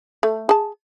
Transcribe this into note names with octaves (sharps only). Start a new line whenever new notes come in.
A3
G#4 A5